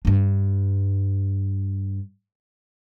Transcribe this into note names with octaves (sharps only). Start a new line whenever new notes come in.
G2 D4